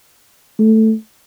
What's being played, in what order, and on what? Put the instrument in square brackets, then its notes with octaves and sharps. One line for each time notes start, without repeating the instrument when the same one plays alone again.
[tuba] A3